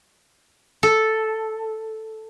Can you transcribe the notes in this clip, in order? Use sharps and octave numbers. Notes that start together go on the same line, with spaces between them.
A4